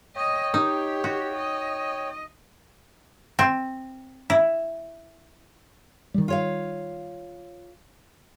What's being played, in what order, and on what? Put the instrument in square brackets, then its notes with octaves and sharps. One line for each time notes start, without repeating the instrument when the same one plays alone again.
[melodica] C#5 G5 [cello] D#5
[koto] D#4 [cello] G4
[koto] F#4
[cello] D#5
[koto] C4
E4
[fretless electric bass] D#3 G3
[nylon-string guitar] F4 C#5 F5